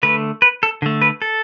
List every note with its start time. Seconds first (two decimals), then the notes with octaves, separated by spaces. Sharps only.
0.03 D3 A3 B4
0.42 B4
0.63 A4
0.82 D3 A3
1.02 B4
1.22 A4